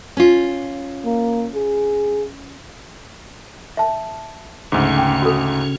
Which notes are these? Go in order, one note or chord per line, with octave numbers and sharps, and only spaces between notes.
C#4 F4
A#3
G#4
E5 A5
D2 G#2 C#3 C#4
G5
F#4 A4